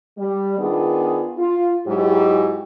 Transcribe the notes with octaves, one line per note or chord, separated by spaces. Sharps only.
G3
D#3 B3 D4 F4 G#4
F4
G#2 F#3 G#3 E4 G4